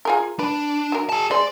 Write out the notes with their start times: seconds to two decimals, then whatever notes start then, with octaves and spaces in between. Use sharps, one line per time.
0.05 F4 G#4 A#4
0.39 D4 B4
0.92 F#3 A#4
1.09 G#4 A5
1.31 G#3 C5 D5